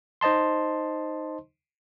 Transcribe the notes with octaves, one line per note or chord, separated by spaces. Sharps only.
D#4 C5 D#5 A5 C6